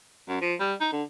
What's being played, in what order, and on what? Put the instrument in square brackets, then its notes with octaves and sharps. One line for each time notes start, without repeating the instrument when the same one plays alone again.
[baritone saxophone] F#2
F3
G3
D#4
D3